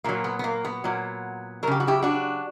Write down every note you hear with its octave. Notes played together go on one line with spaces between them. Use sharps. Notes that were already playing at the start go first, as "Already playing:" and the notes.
A#2 F#3 A#3
B3
B3
A#3
B3
A#2 F#3
C#3 F#3 G4 A#4
F#4
E4 G4
D4 F#4